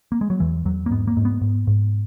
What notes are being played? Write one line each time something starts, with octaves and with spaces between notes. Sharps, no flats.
A#3
G#3
F#3
E2 E3
E2 F#3
A#3
G#2 B3
A#3
G#2
B3
G#2
G#2